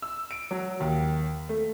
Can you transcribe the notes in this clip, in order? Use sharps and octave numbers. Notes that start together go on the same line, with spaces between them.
E6
D7
F#3
D#2
A3